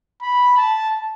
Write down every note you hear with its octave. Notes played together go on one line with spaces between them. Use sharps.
B5
A5